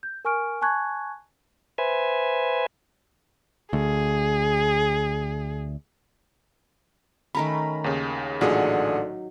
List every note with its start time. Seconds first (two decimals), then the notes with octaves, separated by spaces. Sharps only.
0.03 G6
0.25 A#4 G#5 C#6 F6 D7
0.61 G#5 A5 C#6 F#6 G#6
1.78 B4 C5 E5 G#5
3.73 D2 G#4
7.35 D#3 A3 C#4 A#5 B5
7.84 D#2 C#3
8.41 A1 A#2 D3 F#3 D#4 G#4